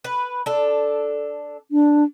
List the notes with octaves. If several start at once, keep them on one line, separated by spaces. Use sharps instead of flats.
B4
D4 A4
D4